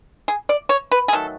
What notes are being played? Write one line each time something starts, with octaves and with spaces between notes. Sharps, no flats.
G#4
D5
C#5
B4
G#4
D#3 F#3 A3 A4